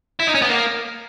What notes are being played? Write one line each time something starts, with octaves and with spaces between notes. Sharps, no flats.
E4
D#4
C#4
B3
A#3